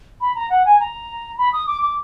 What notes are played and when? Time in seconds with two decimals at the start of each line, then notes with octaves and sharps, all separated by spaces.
0.21 B5
0.35 A#5
0.50 F#5
0.65 G#5
0.80 A#5
1.38 B5
1.53 D#6
1.67 D6
1.81 D6